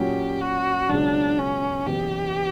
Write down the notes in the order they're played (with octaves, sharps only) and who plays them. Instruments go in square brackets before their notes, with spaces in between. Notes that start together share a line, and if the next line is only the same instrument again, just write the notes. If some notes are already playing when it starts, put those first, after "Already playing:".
Already playing: [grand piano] A#2 F#3 C#4 F#4 [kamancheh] G4
[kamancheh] F#4
[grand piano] C#2 B2 F#3 [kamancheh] D4
[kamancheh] C#4
[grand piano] F#1 E2 B2 [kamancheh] G4